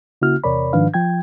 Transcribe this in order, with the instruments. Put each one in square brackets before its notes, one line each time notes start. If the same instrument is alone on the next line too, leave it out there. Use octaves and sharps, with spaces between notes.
[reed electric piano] C#3 A#3 E4 F#4 F6
E2 C3 A#4 C#5 D5 B5
G#2 D#3 F3 D4 B4 F5
F3 G5 G#6